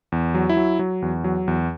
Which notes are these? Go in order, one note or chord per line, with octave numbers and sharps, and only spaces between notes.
E2
F#3
E4
F#3
F#3
E2
F#3
E2